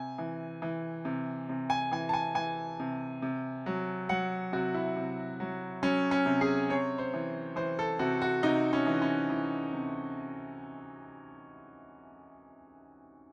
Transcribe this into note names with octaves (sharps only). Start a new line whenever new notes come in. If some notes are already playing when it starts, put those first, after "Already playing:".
Already playing: C3 G#5
E3
E3
C3
C3
G#5
E3 G#5
A5
G#5
E3 G#5
C3
C3
F#3
F#3 F#5
C3 F#4
E4
C3
F#3
F#3 C#4
C#4
C3
G#4
C3 C#5
C5
E3
E3 C5
A4
C3 F#4
F#4
C3 D#4
C#4
E3
C#4
E3
C3